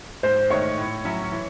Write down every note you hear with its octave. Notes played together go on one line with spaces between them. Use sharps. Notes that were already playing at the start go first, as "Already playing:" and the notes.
G#2 C5
D#3 A3 D#4 C#5
A2
F#3 C#4 E4
E3